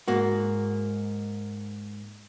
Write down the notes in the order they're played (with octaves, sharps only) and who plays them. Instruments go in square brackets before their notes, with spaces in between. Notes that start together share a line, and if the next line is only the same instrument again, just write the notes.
[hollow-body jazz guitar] G#2 A#3 F#4